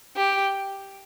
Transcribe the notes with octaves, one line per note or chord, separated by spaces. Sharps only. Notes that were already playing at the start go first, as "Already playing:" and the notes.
G4